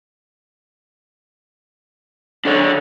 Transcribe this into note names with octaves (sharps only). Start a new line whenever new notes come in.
D3 D4 A4 C#5